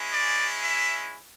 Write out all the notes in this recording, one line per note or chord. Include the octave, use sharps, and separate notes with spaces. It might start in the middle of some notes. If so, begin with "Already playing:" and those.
Already playing: G#3 C#4 E4
D5
E5